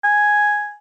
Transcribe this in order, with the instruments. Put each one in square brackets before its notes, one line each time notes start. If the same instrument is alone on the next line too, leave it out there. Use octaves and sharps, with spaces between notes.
[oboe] G#5